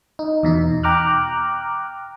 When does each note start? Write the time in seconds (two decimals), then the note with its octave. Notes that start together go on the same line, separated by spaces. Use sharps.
0.19 D#4
0.43 E2 B2 D#4
0.83 G5 A#5 D6 F6 F#6